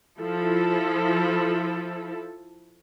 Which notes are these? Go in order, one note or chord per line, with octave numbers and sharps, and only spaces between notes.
F3 E4 A4